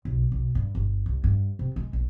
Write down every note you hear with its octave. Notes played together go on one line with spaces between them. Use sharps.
B1
B1
G2
G1
C2
G2
C3
G#3
A#1